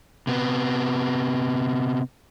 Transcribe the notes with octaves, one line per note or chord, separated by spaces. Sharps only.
C3 B3